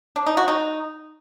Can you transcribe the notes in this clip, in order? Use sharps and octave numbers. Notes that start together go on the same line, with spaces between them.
D4
D#4
F#4
D#4